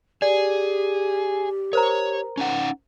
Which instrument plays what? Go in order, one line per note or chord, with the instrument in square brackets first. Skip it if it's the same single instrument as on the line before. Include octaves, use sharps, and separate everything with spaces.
[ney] G4 [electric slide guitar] G#4 [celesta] D5
[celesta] A#4 C5 A#5 [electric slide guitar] C#5
[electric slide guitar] C#4 D#4 F#5